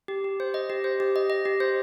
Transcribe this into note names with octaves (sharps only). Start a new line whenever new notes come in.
G4
G4
C5
D#5
G4
C5
G4
D#5
D#5
G4
C5